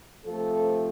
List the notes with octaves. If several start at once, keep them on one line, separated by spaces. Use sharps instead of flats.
C3 F3 A3 A4